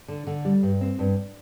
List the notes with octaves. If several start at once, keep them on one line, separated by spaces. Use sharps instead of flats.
D3
D3
G3
G2
C4
G2